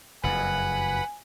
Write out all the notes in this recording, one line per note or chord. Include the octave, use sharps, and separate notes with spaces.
F#1 F2 B4 F#5 G#5 B5